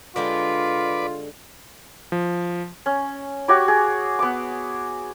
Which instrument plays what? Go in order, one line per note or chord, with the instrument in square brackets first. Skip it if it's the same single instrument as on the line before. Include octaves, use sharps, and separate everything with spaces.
[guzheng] D3 G#3 G4 [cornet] F4 [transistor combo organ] B4 D5
[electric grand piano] F3
[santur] C#4
F#4 G4 C#5 D6
G#4
B3 D6